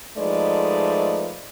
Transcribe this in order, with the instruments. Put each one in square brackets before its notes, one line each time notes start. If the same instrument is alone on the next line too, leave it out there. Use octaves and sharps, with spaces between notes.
[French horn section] F3 G#3 A3 D#4 B4 D5